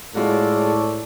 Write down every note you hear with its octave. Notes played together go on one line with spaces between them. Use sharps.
A2 G#3 F4 F#4 A4 C#5 D5